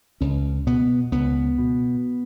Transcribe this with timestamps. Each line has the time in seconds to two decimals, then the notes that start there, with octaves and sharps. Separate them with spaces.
0.21 C#2 C#4
0.67 B2 B3
1.12 C#2 B3
1.58 B2